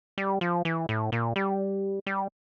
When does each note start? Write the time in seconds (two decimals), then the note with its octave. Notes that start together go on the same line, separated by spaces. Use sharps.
0.18 G3
0.41 F3
0.65 E3
0.89 A2
1.12 A#2
1.36 G3
2.07 G3